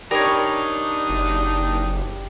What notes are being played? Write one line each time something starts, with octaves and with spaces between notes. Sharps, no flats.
G3 D4 D#4 A#4 C#5
F#1